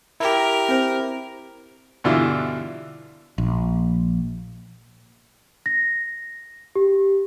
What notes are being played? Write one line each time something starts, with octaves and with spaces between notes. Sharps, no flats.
E4 G4 A#4
C4 C5
G2 B2 D3 E3 E4 F4
A#1
A#6
G4